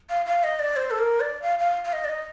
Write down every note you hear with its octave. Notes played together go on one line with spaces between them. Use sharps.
F5
F5
D#5
D5
C5
A4
A#4
D5
F5
F5
F5
D#5
D5
D#5